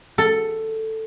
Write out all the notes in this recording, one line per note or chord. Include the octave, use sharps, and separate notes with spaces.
A4